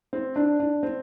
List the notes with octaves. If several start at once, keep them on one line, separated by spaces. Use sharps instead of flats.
C4
D4
D4
C4